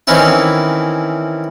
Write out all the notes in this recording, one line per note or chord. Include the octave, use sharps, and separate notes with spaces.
D#3 E3 C4 C#4 E4